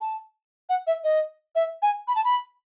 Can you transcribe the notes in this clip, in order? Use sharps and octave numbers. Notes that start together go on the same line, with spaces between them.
A5
F#5
E5
D#5
E5
G#5
B5
A5
B5